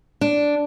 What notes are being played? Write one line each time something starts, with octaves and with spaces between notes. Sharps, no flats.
D4